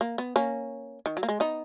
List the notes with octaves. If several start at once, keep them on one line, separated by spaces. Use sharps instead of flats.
A#3
B3
A#3 C#4
D#3
F#3
A#3
G#3
B3 D#4